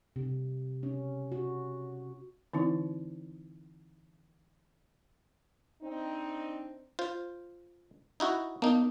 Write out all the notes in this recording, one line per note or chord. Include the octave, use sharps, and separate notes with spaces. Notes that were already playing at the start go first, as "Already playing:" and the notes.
C3
C#4
F#4
D3 E3 C4 D#4 E4
C4 D4 D#4
F4 C5
D#4 E4 F#4
A#3 B3 D#4